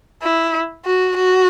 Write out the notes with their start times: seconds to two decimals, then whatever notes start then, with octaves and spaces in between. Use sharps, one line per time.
0.23 E4
0.86 F#4
1.17 F#4